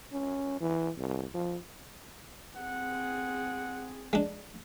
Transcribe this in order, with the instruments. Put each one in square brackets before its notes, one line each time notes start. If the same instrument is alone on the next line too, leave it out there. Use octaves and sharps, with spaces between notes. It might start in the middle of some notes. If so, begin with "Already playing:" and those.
[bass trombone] C#4
E3
C2
F3
[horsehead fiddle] C4 G#4 [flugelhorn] F#5
[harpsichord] G#3 D4